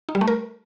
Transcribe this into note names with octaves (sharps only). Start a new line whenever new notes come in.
D#4
G3
A3
A#4